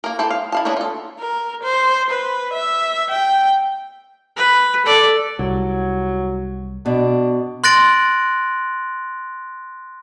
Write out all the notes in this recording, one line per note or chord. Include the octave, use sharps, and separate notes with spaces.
A#3 A#4
E4 G4 A4 C5
F5
E4 F5 A5
B3 D4 E4 C#5 A#5
F4 A4
A#4
C5
B4
E5
G5
B4
A4 D5
C2 F#3
B2 D4
C6 F#6 A6 A#6 D7 F#7